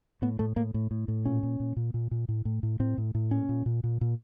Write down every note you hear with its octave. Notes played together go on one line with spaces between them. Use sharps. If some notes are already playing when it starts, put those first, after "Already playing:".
A2 B3
A2 A3
A2 A#3
A2
A2
A2
A#2 C#4
A#2
A#2
A#2
A#2
A#2
A2
A2
A2
A2 C4
A2
A2
A#2 C#4
A#2
A#2
A#2
A#2